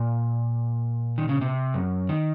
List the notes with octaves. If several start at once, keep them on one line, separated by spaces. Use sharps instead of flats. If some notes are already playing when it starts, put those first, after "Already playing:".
Already playing: A#2
D#3
C#3
C3
F#2
D#3